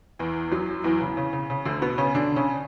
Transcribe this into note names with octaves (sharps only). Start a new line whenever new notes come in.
E2 E3
F#2 F#3
E2 E3
C#3
C#3
C#3
C#3
D2 D3
B2 B3
C#3 C#4
D3 D4
C#3 C#4